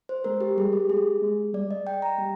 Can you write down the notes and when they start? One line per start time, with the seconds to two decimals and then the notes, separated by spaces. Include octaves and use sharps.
0.09 C5
0.24 G#3 A#4
0.41 G4
0.57 G3 G#4
0.73 G4
0.89 G#3 G#4
1.22 G#3
1.54 G3 D5
1.71 D#5
1.87 G5
2.02 A#5
2.18 G3